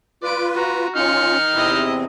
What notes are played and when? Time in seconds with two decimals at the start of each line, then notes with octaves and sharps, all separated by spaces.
0.23 F4 B4 D5 D7
0.54 F#4 A#5
0.96 C#4 D#4 F4 F6 C#7
1.54 E2 C3 C4 E4 D#5